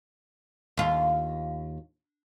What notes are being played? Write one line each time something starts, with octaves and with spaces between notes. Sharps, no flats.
D#2 F4